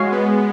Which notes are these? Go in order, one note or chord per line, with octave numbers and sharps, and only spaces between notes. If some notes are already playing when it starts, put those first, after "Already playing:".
Already playing: G#3 F#4 C#5 F5
B3